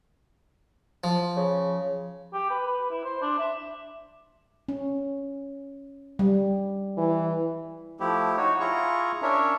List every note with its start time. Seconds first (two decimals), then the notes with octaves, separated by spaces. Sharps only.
1.04 F3
1.37 C#3
2.33 G4
2.50 B4
2.67 B4
2.91 E4
3.04 C5
3.22 D4
3.38 E5
4.68 C#4
6.19 G3
6.98 E3
8.00 F3 A3 E4 G4
8.37 D#4 F#4 C#5
8.60 E4 F4 G#4 A#5 C#6
9.22 C#4 D4 A#4 C#5 E5